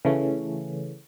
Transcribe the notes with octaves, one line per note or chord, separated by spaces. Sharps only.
C#3 E3 A3 C#4